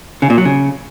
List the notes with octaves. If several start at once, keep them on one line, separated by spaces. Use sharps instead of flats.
C#3
A#2
F#3
C#3